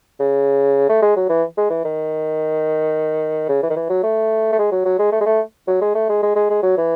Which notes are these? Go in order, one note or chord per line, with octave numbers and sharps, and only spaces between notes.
C#3
A3
G#3
F#3
E3
G#3
E3
D#3
C#3
E3
D#3
E3
F#3
A3
A3
G#3
F#3
F#3
G#3
A3
G#3
A3
F#3
G#3
A3
G#3
G#3
G#3
G#3
F#3
E3